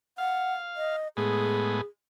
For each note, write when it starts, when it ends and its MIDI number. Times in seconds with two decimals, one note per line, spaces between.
0.18 0.96 77
0.18 0.54 78
0.76 1.08 75
1.17 1.81 45
1.17 1.81 56
1.17 1.81 59
1.17 1.84 68